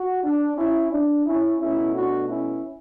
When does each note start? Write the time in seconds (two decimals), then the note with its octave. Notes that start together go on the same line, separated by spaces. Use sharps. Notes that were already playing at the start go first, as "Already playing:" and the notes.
Already playing: F#4
0.24 D4
0.57 C#4 E4
0.92 D4
1.27 C#4 E4
1.60 B2 A3 C#4 E4
1.95 D4 F#4
2.30 C#4 E4